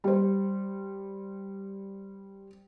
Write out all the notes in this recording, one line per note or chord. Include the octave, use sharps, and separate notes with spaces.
G3 C5